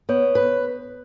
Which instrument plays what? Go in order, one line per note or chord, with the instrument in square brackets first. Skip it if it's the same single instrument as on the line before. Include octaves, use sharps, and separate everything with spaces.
[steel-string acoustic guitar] B3 [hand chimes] C#5
[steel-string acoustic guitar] B4